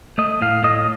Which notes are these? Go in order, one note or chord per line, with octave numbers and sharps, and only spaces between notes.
A3 D#5
A2 F5
A2 D#5